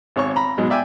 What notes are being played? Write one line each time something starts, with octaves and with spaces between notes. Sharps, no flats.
G#1 C#5 C#6
A#5 B5
G#2 B2 F#3 G#3
D5 E5 G5 G#5